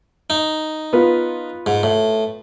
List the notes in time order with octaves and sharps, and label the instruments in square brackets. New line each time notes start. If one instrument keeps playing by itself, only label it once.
[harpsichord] D#4
[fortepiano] B3 F4 B4
[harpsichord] G#2
A2